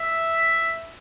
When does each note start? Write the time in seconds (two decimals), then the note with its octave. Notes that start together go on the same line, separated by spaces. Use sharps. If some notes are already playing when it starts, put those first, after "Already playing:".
Already playing: E5